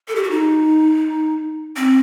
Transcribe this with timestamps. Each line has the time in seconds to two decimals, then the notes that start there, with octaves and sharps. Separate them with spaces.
0.08 A4
0.15 G4
0.23 F#4
0.31 D#4
1.77 C4